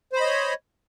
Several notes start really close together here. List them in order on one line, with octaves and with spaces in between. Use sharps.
C5 B5 D#5 C#5